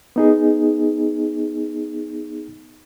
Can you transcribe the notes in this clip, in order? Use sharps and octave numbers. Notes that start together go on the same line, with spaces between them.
B3 D#4 G#4